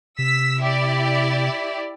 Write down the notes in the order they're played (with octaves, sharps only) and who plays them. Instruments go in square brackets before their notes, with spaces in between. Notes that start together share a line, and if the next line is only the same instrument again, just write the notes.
[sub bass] C3 [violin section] E6 B6
[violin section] E4 G4 D5